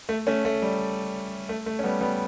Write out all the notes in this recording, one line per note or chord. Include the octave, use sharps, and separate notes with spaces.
A3
A3 C#4
A3
G3
A3
A3
C#4
G3 B3
G3 B3